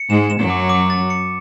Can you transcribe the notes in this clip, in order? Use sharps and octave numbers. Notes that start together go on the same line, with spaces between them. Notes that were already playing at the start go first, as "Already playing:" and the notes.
Already playing: C#7
G#2 G#3 E7
E7
F#2 F#3
D6
D6
A6
C#7